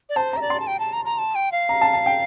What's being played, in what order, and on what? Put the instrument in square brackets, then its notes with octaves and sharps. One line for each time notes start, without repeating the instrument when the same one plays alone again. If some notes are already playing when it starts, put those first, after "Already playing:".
[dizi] D5
[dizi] C5 [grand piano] A5
[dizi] E5 [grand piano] A#5
[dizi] D5
[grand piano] C6
[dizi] A5
G5
A5
A#5
A#5
A5
G5
F5
[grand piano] A#5
A5
A5
G5